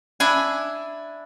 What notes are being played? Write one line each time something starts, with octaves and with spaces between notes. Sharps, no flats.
D4 E4 G#5